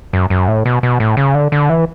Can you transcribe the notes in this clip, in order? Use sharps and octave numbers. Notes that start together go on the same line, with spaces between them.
F#2
F#2
A2
B2
B2
A2
C#3
D3
D3
E3